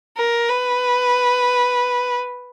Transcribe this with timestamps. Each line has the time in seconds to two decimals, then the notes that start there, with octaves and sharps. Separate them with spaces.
0.17 A#4
0.48 B4